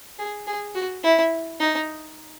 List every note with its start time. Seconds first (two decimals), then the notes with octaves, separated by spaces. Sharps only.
0.19 G#4
0.47 G#4
0.75 F#4
1.03 E4
1.60 D#4